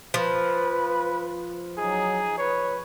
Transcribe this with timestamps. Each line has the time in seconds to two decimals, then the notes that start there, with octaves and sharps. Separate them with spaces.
0.14 F3 B4
1.77 F#3 D#4 G#4
2.37 B4 C#5